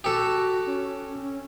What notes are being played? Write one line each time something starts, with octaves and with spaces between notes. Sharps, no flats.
F#4 G4 A4
C#4
C#4